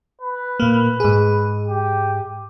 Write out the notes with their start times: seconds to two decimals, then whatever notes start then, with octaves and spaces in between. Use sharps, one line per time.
0.21 B4
0.60 A#2 A#3
1.00 G#2 G#4
1.68 G4